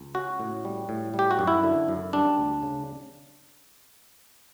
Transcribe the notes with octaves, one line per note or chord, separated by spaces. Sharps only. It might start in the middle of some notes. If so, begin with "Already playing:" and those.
Already playing: C#2
C#4 F#4
A2
G3
A2
G3
G4
F#4
F#2
E4
D3
F#2
G3 D4
D2
C#3